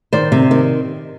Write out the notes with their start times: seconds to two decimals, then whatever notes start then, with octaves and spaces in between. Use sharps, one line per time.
0.13 D#3 C5 D5
0.32 C3
0.51 D#3